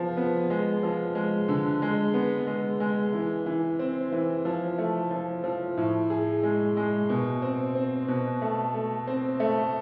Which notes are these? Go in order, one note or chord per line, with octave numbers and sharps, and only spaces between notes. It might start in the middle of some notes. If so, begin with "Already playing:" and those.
Already playing: F3 B3 G#4
B3
G#3
F3
G#3
D3
G#3
B3
G#3
G#3
E3
E3
C4
E3
F3
A3
F3
F3
A2
G#4
G#3
G#3
B2
C4
C4
B2
A3
A3
C4
A3